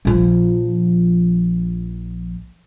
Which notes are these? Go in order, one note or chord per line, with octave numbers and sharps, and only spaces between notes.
A#1 F3